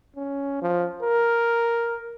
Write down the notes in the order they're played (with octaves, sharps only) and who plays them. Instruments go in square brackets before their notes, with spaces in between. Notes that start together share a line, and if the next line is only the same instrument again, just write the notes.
[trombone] C#4
F3
A#4